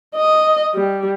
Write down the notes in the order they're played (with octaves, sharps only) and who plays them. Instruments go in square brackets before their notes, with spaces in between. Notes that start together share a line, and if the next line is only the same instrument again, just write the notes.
[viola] D#5
G3